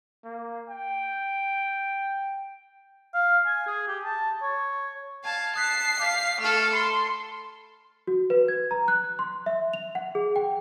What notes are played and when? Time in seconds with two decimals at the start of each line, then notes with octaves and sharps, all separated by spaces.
0.24 A#3
0.69 G5
3.14 F5
3.46 G#5
3.67 G#4
3.88 G4
4.05 A5
4.42 C#5
5.25 F5 A5 G#6
5.56 D#6 F#6 B6 C7
5.99 F5 D6 G6 B6
6.40 A3 A4 F6
6.73 B5 C6 C7
8.07 F#4
8.30 B4
8.48 G#6
8.71 A#5
8.88 F#6
9.19 C6
9.46 E5
9.73 F7
9.95 F#5
10.15 G#4
10.36 G5